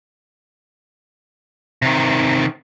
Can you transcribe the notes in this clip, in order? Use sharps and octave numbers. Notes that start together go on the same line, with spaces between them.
C3 D#3